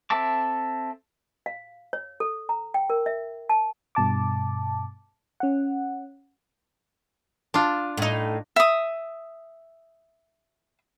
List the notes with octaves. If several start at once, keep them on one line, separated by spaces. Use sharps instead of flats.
C4 A4 E5 A5 D6
F5
C#5
A4
A#5
G5
A#4
E5
A5
G2 B2 A5 D6
C#4 F#5
D4 F4
A2 D#4
E5 D#6